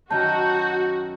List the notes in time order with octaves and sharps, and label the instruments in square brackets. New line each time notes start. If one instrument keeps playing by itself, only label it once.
[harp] F#2 D#3 [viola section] F#4 [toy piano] A5 [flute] G6